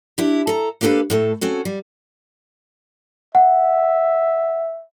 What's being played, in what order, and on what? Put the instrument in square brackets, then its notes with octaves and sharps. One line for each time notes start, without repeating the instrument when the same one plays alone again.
[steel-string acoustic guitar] D4 E4 G4
A4 A#5
A#3 D4 G4 A4 B4 F5
A2 A3 A4
C4 C#4 F#4 A4
G3
[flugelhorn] E5 [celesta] F#5